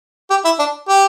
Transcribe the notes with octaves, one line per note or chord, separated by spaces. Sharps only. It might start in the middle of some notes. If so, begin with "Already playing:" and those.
G4
E4
D4
G4